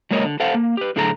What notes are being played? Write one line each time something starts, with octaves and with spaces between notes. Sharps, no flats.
F#3 G#3 A#3 A#4 C#5 D#5
D3
A4 C5 F5 F#5
A#3
G4 B4
A2 D3 F#3 G#4 A4 A#5